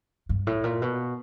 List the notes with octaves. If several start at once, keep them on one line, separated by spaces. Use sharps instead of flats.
G2
A2
A#2
B2